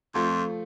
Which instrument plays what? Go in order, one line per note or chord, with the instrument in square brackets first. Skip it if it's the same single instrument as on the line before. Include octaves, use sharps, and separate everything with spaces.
[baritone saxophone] F2 [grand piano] F3 A3